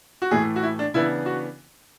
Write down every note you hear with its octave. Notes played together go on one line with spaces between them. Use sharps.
F#4
A2 E3 A3 G#4
F#4
E4
D4
C#3 E3 B3 D4 E4
F#4